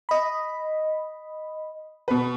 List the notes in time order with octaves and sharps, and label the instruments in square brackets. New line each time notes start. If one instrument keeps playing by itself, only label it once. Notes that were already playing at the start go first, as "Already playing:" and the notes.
[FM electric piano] D#5 B5
[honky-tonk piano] B2 B4